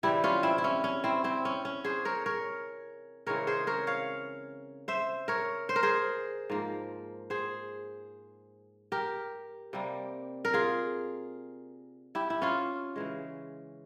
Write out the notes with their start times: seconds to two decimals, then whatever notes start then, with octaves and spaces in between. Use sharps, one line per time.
0.03 C3 E3 G3 E4 G4
0.24 C#4 F4
0.43 C4 E4
0.58 E4
0.64 C#4
0.84 C#4
1.04 C4 E4
1.24 C4 E4
1.45 C#4
1.65 C#4
1.84 G#4 C5
2.05 A#4 C#5
2.26 A#4 C#5
3.26 C#3 E3 G#3 C4 A#4 C#5
3.47 G#4 C5
3.67 A#4 C#5
3.87 C#5 F5
4.88 C5 E5
5.28 A#4 C#5
5.69 C5
5.76 A#4
5.83 G#4 C5
6.50 G#2 F3 A#3
7.30 G#4 C5
8.92 G4 A#4
9.73 C3 G3 A#3
10.45 A#4
10.54 F4 G#4
12.15 E4 G4
12.30 E4
12.42 C#4 F4
12.96 C#3 E3 G#3